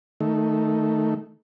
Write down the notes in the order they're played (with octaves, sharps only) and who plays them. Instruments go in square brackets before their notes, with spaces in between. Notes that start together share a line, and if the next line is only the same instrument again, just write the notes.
[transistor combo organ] D#3 A3